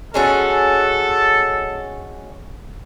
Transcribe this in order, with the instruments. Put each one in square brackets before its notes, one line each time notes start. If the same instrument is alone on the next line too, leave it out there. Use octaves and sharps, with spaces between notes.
[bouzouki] G#3 C#4 F#4 [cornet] A4